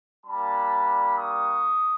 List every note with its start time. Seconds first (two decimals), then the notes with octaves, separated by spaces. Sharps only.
0.25 G3 A#3 D4 A5 B5
1.17 C#6 D#6